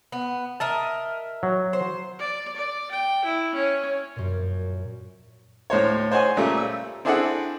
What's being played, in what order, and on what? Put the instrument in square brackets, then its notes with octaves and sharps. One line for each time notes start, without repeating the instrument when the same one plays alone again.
[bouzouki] B3
[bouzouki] A#4 D#5 E5 [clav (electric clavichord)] A5
[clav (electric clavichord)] F#3
[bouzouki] C5
[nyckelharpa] D5
D5
G5
E4
C#4
[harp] F#2 A#2
[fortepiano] D2 A2 C5 C#5
C5 C#5 F#5 G#5 C6
A#2 C#3 G3 A3
E6
C4 D4 E4 G#4 A4 F#5